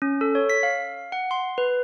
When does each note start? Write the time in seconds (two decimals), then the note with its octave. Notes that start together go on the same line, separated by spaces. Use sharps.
0.02 C#4
0.21 A4
0.35 C#5
0.50 B6
0.63 F5
1.12 F#5
1.31 C6
1.58 B4